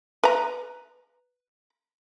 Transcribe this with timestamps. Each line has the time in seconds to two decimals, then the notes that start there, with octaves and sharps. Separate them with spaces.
0.24 B4 A#5